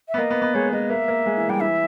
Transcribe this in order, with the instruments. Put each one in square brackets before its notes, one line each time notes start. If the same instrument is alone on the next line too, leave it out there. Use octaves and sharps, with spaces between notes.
[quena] E5
[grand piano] B3
[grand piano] A#3 [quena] D#5
[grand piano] B3
B3
[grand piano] G#3 [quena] C#5
[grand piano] G#3 [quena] D#5
[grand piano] A#3 [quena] E5
[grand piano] A#3
G#3
E3
[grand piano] G3 [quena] G5
[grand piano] E3 [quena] E5